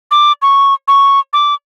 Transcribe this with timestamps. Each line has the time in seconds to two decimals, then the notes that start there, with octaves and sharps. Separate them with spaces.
0.11 D6
0.42 C#6
0.88 C#6
1.33 D6